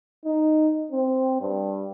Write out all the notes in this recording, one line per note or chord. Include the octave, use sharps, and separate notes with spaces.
D#4
C4
G2